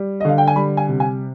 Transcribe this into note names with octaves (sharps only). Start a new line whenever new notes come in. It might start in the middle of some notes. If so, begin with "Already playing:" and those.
Already playing: G3
D#5
D3 F5
G5
G#5
G3 B5
G#5
C3
G#5